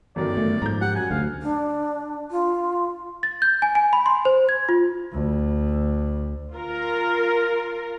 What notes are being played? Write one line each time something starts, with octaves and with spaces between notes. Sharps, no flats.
G1 F#2 D#3 D5
A3
G#2 F3 A#5 G6
G4 F#5
F#2 G#5
D2 F5
D4
F4
A6
G6
G#5
G#5
B5
C6
C5
G#6
F4
D2
F4 A#4